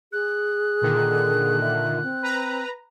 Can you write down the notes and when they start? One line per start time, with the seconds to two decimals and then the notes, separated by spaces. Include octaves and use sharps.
0.12 G#4 F#6
0.82 A#2 D3 D#3
1.61 E5
2.03 C4
2.22 B4 A#5